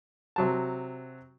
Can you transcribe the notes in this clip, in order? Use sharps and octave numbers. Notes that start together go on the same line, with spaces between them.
C3 F#3 A5